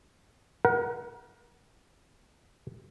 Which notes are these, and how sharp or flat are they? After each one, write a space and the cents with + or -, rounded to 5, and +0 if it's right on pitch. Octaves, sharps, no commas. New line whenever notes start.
A#4 +35 F#5 +15